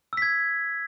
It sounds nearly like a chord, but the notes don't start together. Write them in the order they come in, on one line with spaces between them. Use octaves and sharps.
E6 B6 G#6